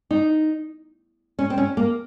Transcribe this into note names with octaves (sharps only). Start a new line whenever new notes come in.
D#4
C#4
C4
C#4
A#3